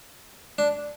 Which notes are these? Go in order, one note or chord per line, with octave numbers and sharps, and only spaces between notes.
D4